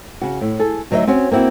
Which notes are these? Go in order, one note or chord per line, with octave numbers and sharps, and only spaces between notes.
C#3 F#4
A2
G#4 A4
D2 F#3 D#4 C#5 D#5 E5
C4 C#4 F#4
A#3 C4 E4 F#4